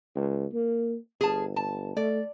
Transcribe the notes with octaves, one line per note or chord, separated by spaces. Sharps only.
C#2
A#3
G1 G#4 A5
A5
A3 D5